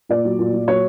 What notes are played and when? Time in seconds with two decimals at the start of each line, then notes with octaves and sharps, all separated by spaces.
0.09 A#2 D5
0.25 F#3
0.39 A#2
0.53 A#2
0.67 F#3 C#5